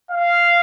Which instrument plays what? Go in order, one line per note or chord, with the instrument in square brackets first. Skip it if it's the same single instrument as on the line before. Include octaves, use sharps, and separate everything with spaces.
[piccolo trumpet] F5